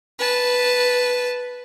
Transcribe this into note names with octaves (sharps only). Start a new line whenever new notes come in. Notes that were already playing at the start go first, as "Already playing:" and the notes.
B4 A5